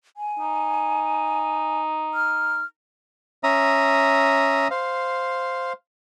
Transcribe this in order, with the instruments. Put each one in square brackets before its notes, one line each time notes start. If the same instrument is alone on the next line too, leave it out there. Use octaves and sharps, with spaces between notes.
[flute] G#5
[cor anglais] D#4
[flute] F6
[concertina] C#4 E5 A#5 D#6
C5 F5